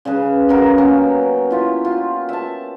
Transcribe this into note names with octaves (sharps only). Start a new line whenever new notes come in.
C#3 C#4 G#4 B4
C#3 F#3 G4 A#4
A#3 B3 C#4
E4 F4 G4
F4
E5 A5